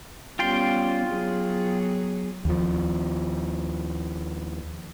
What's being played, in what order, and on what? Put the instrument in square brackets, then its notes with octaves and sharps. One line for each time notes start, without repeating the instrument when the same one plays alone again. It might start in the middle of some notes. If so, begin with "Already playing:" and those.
[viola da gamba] G3 B3 C#4 [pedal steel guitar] F4 G5 C6
[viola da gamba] F#3 B3 G#4
[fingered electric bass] D#2 F3